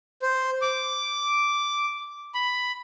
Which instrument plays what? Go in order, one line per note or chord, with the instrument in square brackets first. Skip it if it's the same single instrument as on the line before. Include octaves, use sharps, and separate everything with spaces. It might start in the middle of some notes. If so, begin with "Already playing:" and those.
[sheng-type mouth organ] C5
D6
B5